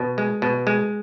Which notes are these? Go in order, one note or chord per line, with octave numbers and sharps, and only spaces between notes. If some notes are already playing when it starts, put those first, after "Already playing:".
Already playing: B2
G#3
B2
G#3